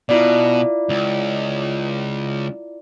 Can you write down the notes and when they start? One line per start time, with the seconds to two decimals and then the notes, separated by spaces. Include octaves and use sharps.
0.09 B2 E4 F4 D5
0.89 C#2